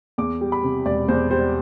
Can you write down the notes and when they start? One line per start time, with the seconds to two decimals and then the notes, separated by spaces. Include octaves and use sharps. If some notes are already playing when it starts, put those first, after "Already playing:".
0.18 E2 D6
0.41 G3
0.52 B5
0.64 C3
0.85 E1 D5
1.08 E2 C5
1.31 G3 C5